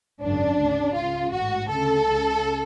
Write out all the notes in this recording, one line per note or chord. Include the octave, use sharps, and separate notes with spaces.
G#1 F#2 C#3 D4
D2 C#3
C#2 C#3 F4
A1 G#2 F#4
D2 C#3 A4
C#2 C#3